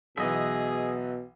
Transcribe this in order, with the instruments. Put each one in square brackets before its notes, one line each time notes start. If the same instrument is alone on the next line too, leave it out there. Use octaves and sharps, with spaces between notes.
[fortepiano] B1 E3 [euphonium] B2 [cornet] G#4 [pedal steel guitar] D#5 E5